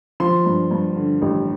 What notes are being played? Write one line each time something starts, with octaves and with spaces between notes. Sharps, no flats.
F3 C6
G2
G2
D3
A1